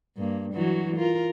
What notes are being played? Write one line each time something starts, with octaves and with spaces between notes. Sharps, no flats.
G2 A#3
E3 F#3 F#4
F4 A#4